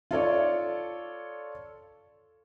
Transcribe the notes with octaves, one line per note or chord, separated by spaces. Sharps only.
F4 A4 C#5 D5